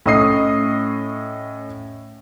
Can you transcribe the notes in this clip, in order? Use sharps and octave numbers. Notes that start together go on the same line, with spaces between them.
A2 C#4 D#5 D#6 C7